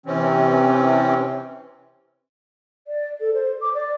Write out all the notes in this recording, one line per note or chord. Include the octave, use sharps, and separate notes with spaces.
C3 E3 C4 C#4
D5
A4
C5
D6
D5